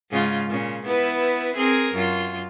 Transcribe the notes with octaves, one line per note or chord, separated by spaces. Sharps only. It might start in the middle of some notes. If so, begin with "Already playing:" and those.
G#2 C#3 F4
A#2 C#3
B3 E4 B4
C4 G#4 A#4
F#2 F4